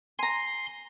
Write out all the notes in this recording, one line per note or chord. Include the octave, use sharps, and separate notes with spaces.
G#5 A#5 C6